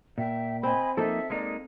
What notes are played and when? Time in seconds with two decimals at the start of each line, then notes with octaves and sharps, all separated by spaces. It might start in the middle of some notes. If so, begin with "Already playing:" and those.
0.18 A#2 E5 G5
0.63 C4 D#5 G#5 B5
0.97 F3 A#3 D#4 A4 E5
1.30 G#3 A#3 D#4 D5